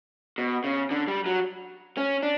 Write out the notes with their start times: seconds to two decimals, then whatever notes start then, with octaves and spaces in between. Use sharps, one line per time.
0.38 B2
0.64 C#3
0.91 D3
1.08 G3
1.26 F#3
1.97 C#4
2.23 D4